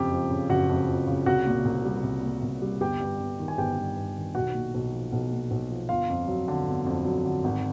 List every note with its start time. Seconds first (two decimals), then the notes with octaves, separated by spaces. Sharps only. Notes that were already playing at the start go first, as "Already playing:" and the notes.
Already playing: F#1 F2 G4 G5
0.11 F3
0.30 C#3
0.50 F#1 F#4 F#5
0.69 F2
0.88 F3
1.07 C#3
1.26 C2 F#4 F#5
1.46 A#2
1.65 C2
1.85 G3
2.03 C2
2.23 A#2
2.42 C2
2.62 G3
2.80 G1 G4 G5
3.00 G2
3.20 G1
3.39 D#3
3.48 G#5
3.57 G1 G4 G5
3.77 G2
3.97 G1
4.16 D#3
4.35 B1 F#4 F#5
4.54 A#2
4.74 B1
4.93 F3
5.12 B1
5.31 A#2
5.51 B1
5.70 F3
5.89 G1 F4 F5
6.09 F2
6.28 F#3
6.48 D3
6.67 G1
6.86 F2
7.05 F#3
7.25 D3
7.44 G#1